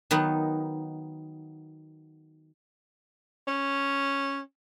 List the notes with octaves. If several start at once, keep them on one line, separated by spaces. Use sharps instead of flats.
D#3 F#3 B3 D#4
C#4